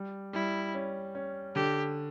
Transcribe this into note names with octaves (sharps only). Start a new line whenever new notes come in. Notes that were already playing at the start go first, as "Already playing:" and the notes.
Already playing: G3
G3 E4
C#4
C#4
D3 G4